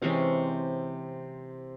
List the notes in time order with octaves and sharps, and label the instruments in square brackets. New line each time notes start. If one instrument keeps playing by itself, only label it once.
[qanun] C3 E3 G#3 C#4 [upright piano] C4